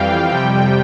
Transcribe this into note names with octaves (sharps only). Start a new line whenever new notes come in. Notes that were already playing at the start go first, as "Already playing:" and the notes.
Already playing: F2 E3 G3 F5 G5
F2 C3 G3 G5